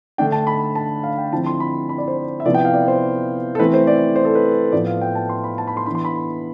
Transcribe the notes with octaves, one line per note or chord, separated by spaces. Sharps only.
D3 A3 D4 G5
A5
B5
A5
F5
G5
D3 F3 C4 E4 A5
C6
B5
B5
D5
C5
E5
C3 F3 B3 E4 D5
G5
F5
D5
C5
A4
E3 A3 C4 E4 B4
C5
D5
C5
A4
B4
A2 F3 B3 D5
F5
G5
A5
C6
B5
A5
B5
C6
E3 B3 D4 B5
C6
B5